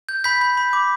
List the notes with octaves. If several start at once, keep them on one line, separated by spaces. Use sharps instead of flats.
G6
B5 G6 B6
G6
B5
D6